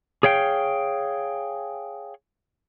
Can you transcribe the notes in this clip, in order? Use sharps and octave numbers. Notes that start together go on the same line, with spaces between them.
G#4 C#5 F5 G5